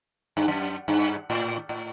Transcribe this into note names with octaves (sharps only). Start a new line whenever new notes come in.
G2
F#2
G2
A2
A2